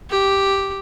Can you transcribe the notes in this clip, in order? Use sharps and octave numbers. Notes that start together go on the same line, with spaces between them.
G4